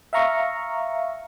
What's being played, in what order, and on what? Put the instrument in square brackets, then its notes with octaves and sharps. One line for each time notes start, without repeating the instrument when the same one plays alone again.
[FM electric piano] E5 F5 A#5 C#6